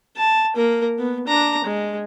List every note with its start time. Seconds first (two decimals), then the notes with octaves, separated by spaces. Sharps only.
0.16 A5
0.56 A#3 A#4
0.98 B3
1.27 D4 A#5
1.64 G#3